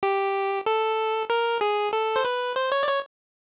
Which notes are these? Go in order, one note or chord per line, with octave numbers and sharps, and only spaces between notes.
G4
A4
A#4
G#4
A4
C5
B4
C5
C#5
D5
C#5